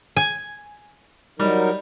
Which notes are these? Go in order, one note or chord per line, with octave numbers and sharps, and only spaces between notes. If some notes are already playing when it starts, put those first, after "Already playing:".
G#5
F#3 G3 D#4 A#4